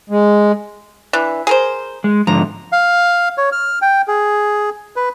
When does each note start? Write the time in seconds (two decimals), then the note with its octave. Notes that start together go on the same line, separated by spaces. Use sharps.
0.10 G#3
1.13 E3 D4
1.47 G#4 A#4 C5
2.04 G#3
2.27 G#2 D3 F3 A#5
2.72 F5
3.38 C#5
3.52 F6
3.82 G5
4.08 G#4
4.96 B4